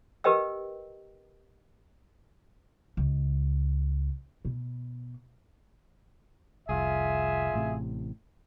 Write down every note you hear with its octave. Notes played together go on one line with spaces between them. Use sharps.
G4 A#4 B4 D#5 G5 E6
C#2
B2
F1 C2 F4 G#4 E5
A1 A2 C3